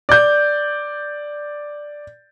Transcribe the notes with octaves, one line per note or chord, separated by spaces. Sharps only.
D5 G6